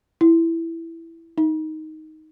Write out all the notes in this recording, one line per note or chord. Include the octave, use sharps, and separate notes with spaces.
E4
D#4